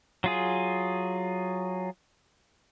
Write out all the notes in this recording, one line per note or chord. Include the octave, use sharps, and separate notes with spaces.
F#3 F4 G#4